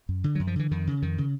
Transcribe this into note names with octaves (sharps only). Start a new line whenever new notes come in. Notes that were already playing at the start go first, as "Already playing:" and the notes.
F#2
D3
F#2 F#3
F3
D3 E3
F2 D#3
C#3
F2 D#3
C#3